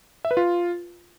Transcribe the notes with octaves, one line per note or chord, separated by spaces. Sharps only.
E5
B4
F4